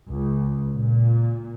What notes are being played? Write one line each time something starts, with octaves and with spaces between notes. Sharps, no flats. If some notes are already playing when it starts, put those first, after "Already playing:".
C#2
A#2